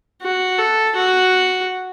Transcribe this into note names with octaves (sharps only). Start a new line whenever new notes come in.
F#4
A4
F#4